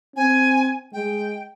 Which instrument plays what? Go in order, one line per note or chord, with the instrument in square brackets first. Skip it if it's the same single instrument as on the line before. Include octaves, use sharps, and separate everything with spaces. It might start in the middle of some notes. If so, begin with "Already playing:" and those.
[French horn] C4 [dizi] G#5
[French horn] G#3 [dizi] G5